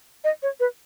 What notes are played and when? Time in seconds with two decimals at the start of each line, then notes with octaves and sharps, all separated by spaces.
0.24 D#5
0.43 C#5
0.60 B4